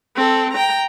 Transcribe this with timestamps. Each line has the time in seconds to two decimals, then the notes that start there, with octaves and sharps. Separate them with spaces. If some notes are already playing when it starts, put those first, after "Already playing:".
0.16 C4 A4
0.53 G5 A#5